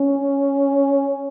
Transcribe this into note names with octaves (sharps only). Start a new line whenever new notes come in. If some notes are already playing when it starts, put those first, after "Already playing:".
Already playing: C#4